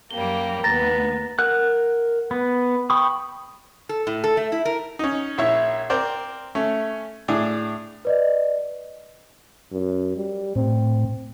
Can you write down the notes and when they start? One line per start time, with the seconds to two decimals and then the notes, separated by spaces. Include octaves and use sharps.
0.11 F#2 G3 A#3 G7
0.64 D#2 B3 A#5 A6 A#6
1.39 A#4 F#5 F#6
2.31 B3
2.90 G5 B5 C#6 D#6
3.89 A4
4.07 A2
4.24 A4
4.37 A3
4.52 E4
4.65 A#4
4.99 C#4 D#4
5.38 A#1 E4 C#5 E5
5.90 C4 A#4 C5 D5
6.55 A3 C#4
7.28 A2 D4 G#4
8.05 B4 D5 D#5
9.72 F#2
10.16 G3
10.55 A2 C4